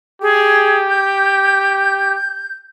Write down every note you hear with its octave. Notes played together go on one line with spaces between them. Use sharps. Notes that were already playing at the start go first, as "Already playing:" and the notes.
G4 G#4
G6